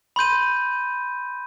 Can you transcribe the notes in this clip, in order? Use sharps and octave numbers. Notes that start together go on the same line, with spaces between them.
B5 C6 G6 D#7